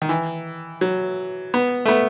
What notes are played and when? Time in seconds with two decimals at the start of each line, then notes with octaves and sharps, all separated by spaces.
0.02 D#3
0.09 E3
0.81 F#3
1.54 B3
1.85 A3
1.88 B3